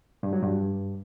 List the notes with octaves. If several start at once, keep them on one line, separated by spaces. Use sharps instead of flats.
G2
F#3
G2